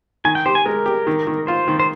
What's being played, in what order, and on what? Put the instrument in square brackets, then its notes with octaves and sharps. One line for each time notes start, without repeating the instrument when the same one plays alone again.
[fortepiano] D#3 [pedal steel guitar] G#5
[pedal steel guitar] G5
[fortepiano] G4 [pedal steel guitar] C5
[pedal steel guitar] G#5
[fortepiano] G#3 [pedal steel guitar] A#4
[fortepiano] G4
D#3
D#3
[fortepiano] F4 [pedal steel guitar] C5
[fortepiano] D#3
[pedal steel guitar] C5